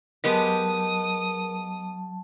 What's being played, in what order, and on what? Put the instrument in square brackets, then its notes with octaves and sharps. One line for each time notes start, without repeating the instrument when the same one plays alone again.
[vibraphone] F#3 A5 [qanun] G#3 B3 G4 [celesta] A#4 [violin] D#6